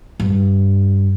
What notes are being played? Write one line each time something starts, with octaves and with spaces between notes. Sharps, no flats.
G2